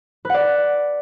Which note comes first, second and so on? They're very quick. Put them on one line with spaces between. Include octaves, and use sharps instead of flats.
B4 F#5 D5